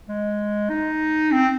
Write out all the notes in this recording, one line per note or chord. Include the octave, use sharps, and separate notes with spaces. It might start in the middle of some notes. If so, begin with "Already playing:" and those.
G#3
D#4
C4